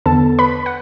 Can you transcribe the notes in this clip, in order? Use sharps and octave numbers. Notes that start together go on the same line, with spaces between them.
E2 D3 B3 A4 A5
B4 B5
F#5